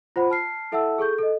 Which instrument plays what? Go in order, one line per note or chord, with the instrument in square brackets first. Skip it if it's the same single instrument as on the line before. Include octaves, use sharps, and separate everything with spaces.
[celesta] F4 C5 F#5 B5
A5 F6 C7
E4 A4 E5 F#5 A5 E6
G#4 A4 C#6 G6
A4 D#5